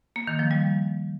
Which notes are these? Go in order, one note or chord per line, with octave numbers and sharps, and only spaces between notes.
A#3
D#3
F3
G3